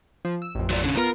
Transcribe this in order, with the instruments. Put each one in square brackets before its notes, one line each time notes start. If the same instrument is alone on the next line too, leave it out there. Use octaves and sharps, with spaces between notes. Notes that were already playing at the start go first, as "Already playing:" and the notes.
[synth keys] F3
E6
A1 F2
[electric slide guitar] F#3 F4 D5
D3 C#4
[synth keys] B3 F4 [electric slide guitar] A#4 A#5